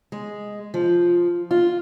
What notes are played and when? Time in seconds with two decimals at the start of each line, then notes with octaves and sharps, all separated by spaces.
0.12 G#3
0.74 F3
1.51 F4